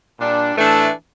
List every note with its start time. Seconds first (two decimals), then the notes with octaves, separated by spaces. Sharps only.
0.19 A#2 G3 D4
0.55 A2 E3 A3 D4